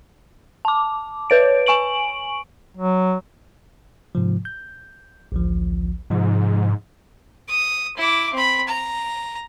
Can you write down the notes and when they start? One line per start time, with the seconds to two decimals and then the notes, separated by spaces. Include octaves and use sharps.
0.65 A5 D6
1.30 B4 C#5 D7
1.66 G#5 C#6 D7 F#7
2.77 F#3
4.15 G#2 C3 F3
4.45 G6
5.32 A1 D2 F3
6.10 G#2 C3 F3
7.49 D#6
7.97 E4 D6
8.34 C4 B5
8.68 A#5